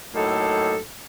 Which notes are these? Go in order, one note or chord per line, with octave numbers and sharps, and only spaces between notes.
A2 F#3 A#3 D#4 A4